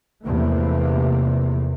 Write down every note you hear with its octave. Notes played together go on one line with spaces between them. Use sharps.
E2 C3 F3 A3 A#3